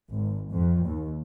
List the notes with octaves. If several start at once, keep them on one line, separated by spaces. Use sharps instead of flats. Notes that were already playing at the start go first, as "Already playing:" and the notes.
G#1
F2
D#2